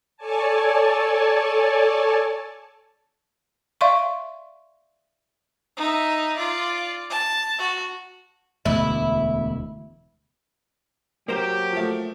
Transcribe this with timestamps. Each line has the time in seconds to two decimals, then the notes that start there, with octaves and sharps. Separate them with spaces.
0.17 A4 C#5 D5 G#5 A5
3.81 D5 E5 F5 C6 C#6
5.77 D#4 E5
6.36 F4 D5
7.10 A5
7.59 F#4
8.65 E1 D2 E4
11.28 F#3 A#3 G4 A#4 C5
11.73 F3 A3